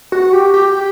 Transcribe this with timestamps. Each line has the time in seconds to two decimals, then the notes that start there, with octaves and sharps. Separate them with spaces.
0.12 F#4
0.33 G4
0.54 G4